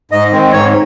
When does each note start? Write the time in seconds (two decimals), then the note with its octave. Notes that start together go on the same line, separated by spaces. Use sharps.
0.11 G#2 D#5
0.32 D#3 G#3 C4
0.52 G#2 C#5